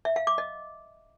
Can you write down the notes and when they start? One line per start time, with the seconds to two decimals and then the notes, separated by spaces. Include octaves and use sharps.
0.05 E5
0.16 F5
0.27 D6
0.38 D#5